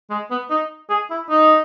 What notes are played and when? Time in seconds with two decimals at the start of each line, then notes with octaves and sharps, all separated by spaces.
0.10 G#3
0.30 B3
0.50 D#4
0.90 G#4
1.10 E4
1.30 D#4